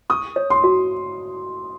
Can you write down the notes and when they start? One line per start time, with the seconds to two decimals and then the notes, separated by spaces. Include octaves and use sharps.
0.10 C#6 D#6
0.36 C#5
0.50 C6
0.64 F#4